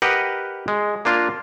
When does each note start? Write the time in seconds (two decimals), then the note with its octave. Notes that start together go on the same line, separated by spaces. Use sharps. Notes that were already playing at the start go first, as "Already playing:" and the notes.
0.02 G4 A#4 B4 D#5 F#5
0.68 G#3
1.05 A#3 D4 F4 F5